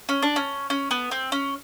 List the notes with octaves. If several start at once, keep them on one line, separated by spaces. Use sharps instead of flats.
C#4
D4
C#4
C#4
B3
C4
C#4